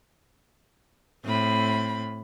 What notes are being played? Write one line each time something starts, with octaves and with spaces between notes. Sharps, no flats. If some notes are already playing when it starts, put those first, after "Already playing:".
A2 C4 B5